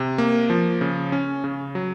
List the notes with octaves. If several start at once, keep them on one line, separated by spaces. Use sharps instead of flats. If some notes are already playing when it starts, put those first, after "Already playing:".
Already playing: C3
A#3
F3
C#3
C#4
C#3
F#3